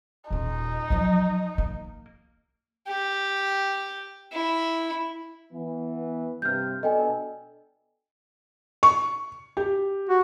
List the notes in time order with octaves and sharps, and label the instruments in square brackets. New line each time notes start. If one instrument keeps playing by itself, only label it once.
[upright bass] D#1 F4 [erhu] D#4
[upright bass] F3 F#3
A#3
[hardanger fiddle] G4
E4
[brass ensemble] E3 B3
[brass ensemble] G2 C3 [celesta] F6 G6
[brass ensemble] B2 D4 A4 [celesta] D#5 G5 G#5
[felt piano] C#6
G4
[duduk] F#4